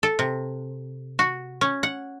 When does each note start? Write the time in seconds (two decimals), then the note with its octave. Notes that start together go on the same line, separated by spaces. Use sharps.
0.03 A4
0.19 C3
1.19 F#4
1.61 C#4
1.83 F#5